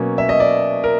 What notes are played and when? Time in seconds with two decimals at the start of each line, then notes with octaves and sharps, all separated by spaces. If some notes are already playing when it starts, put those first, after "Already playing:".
Already playing: B2 F#3 A#3 C#4
0.18 E5
0.29 D#5
0.40 D5
0.84 A#4